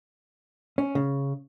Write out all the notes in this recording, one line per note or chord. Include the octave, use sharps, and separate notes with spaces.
C#4
C#3